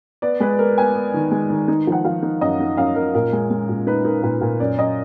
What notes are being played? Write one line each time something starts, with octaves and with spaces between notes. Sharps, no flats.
B3 D5
G#3 B4
B3 A#4
B3 G#5
B3
D#3
G#3
D#3
D#4
F3 F#5
F3 F5
D#4
F#2 D#5
D#4
F#2 F5
F#2 A#4
A#2 A#4
G#3
G#3
A#2
D#4 B4
D#4 A#4
A#2 B4
A#2
F#2 D5
F#2 D#5